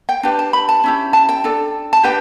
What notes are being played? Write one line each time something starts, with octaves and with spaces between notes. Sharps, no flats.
G5
D4 G4 B4
A5
B5
A5
C#4 E4 G4
A5
G5
D4 A4
A5
D4 G4 B4 G5